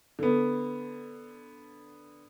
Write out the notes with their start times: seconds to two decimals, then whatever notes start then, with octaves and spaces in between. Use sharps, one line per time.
0.19 D3 B3